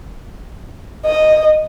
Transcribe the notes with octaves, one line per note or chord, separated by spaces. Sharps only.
D#5